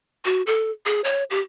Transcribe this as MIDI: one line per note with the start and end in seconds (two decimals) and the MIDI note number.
0.25 0.42 66
0.47 0.71 69
0.86 1.01 68
1.04 1.24 73
1.30 1.40 67